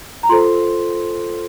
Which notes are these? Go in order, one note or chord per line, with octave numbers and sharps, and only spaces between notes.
A#5
F4 A4 C5 C6